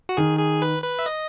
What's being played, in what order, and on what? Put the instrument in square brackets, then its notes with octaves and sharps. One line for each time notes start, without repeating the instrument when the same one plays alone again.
[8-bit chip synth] F#4
[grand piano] D#3 [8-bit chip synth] G#4
[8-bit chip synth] G#4
B4
B4
E5
D#5